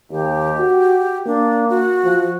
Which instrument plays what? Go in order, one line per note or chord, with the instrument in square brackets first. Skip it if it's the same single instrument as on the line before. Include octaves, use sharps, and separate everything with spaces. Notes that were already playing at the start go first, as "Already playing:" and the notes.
[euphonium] D#2 [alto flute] G4
[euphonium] F#4
[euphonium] A#3 [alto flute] D4
[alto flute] F#4
[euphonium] F3